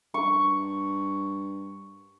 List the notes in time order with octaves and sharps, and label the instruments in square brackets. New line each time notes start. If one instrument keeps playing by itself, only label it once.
[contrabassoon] G2 [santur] C#6